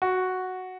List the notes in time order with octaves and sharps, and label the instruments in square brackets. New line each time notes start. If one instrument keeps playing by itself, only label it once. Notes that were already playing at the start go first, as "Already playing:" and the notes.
[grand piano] F#4